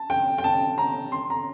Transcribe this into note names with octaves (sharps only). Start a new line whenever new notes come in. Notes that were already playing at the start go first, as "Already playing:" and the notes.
Already playing: A5
G5
G5
A5
A#5
C6
A#5